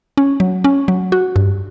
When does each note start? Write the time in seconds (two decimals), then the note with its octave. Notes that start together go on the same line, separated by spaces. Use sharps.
0.17 C#4
0.40 F#3
0.64 C#4
0.88 F#3
1.12 F#4
1.36 G2